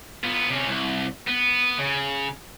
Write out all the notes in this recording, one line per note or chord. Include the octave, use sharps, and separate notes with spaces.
B3 F4
C3 C#4
C2
B3
C#3